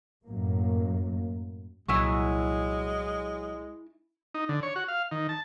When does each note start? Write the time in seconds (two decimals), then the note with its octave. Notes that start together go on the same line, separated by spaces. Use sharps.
0.24 F#2 A2 A#3
1.89 C2 A#2 F#3 G#3 E4 G#5 C#6
4.35 D#4
4.49 D3
4.63 C#5
4.76 F#4
4.88 F5
5.11 D#3
5.29 A5